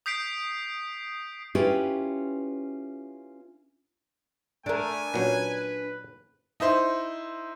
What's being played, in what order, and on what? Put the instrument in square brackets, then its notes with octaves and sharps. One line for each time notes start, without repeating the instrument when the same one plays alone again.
[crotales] D#6 G6 B6 C7 D7
[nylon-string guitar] C#4 E4 F4 G4 G#4 B4
[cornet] A3 [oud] D4 A#4 [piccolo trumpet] G#5
[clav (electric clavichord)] A#2 F#3 C#4 [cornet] B4
[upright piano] D#4 E4 C5